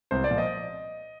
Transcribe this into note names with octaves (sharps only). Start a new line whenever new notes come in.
C2 C5
D5
A#2 F3
D#5